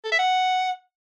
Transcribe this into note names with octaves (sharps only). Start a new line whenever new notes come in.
A4
E5
F#5